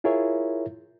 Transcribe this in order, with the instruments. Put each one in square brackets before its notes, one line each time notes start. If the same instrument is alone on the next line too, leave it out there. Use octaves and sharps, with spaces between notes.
[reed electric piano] E4 F4 G#4 A#4 C#5 E5